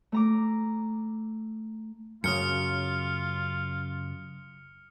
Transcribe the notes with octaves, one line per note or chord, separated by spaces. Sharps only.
A3 A#5 D6
F#2 C#3 F4 D#6 F6 C#7